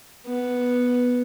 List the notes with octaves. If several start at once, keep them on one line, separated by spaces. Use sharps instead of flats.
B3